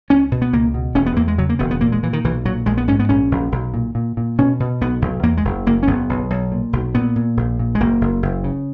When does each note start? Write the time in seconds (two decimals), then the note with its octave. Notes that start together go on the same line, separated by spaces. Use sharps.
0.10 C#2 C#4
0.32 B2
0.42 B3
0.53 C#2 A#3
0.74 B2
0.95 E1 C#4
1.06 B3
1.16 E2 A#3
1.28 G#3
1.38 C#3 F#3
1.49 A#3
1.59 E1 B3
1.71 B3
1.81 A#2 A#3
1.92 G#3
2.03 A#2 E3
2.13 D#3
2.24 B1 E3
2.45 A#2 F#3
2.66 A#1 G#3
2.77 B3
2.88 G#2 C#4
2.99 B3
3.09 A#1 C#4
3.31 A#1
3.52 B1
3.74 A#2
3.95 A#2
4.17 A#2
4.38 B2 C#4
4.60 B2
4.81 B1 B3
5.02 B1
5.23 E2 A#3
5.37 G#3
5.45 F#1
5.66 F#1 A#3
5.83 C#4
5.87 F#1 B3
6.09 B1
6.30 B1
6.52 A#2
6.73 B1
6.95 A#2 B3
7.16 A#2
7.37 A#1
7.59 A#2
7.75 G#3
7.80 F#1 A#3
8.01 F#1
8.23 F#1
8.44 C#3